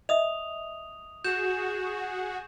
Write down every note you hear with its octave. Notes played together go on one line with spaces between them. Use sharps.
D#5 E5 D#6 F7
F#4 G#4 G6 E7